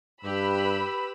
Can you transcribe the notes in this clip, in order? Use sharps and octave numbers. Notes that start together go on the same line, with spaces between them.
G2 G4 B4 B5 E6